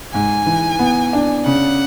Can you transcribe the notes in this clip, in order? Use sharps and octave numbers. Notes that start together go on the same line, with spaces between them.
G#2 G#5
E3
B3
D4
C#3 F#5